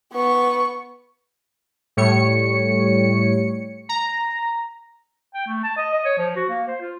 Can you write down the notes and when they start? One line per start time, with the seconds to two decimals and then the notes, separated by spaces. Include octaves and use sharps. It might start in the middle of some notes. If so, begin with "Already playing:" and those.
0.13 B3 C#6
1.97 A2 G3 C#5 C#7
3.89 A#5
5.35 G5
5.47 A3
5.63 A5
5.77 D#5
5.94 D#5
6.05 C#5
6.18 F3
6.36 F#4
6.49 A#3
6.68 C5
6.81 F4